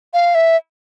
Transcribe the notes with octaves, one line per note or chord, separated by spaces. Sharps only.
F5
E5